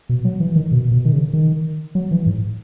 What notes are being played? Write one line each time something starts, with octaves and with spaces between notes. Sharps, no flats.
B2
F#3
E3
D#3
B2
B2
D#3
C#3
D#3
F#3
E3
G#2